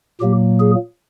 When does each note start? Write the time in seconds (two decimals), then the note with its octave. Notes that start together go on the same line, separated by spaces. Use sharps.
0.21 A#2 F#3 A#3 G4
0.60 G#4